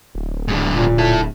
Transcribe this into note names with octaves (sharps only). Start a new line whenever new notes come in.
D1
G#2 D3
A#2
E4 A4